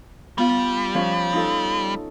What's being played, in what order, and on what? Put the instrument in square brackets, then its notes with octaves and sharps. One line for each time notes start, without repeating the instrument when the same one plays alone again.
[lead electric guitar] G3 [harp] B3 F4
[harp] F3 C#4 B4
D#4 F4 A4